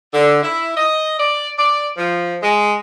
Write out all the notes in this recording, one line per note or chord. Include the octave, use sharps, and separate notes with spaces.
D3
E4
D#5
D5
D5
F3
G#3